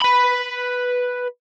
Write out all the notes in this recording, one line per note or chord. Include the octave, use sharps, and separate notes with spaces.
B4 B5